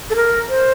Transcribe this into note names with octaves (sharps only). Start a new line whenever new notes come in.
A4
A#4
C5